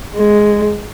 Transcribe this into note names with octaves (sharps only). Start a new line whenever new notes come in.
G#3